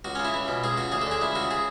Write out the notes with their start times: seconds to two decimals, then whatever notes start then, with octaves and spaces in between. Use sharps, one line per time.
0.05 C#2 F#4
0.15 C#3 C#4
0.25 E4
0.34 C#2
0.48 B2
0.64 C#2 G#4
0.77 C#3 F#4
0.92 D2 G#4
1.01 A4
1.07 D3 G#4
1.21 C#2 E4
1.35 C#3 F#4
1.51 G#4